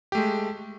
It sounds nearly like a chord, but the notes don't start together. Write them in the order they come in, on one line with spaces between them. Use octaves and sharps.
G4 A3 G#3